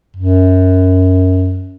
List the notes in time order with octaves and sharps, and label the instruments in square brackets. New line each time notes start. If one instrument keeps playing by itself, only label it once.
[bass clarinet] F#2